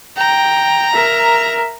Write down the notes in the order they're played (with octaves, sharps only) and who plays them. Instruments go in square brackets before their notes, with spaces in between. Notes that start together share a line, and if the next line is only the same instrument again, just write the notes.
[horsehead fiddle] G5 [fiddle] A#5
[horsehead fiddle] A#4 E5